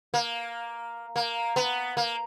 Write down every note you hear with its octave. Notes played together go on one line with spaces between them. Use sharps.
A#3
A#3
B3
A#3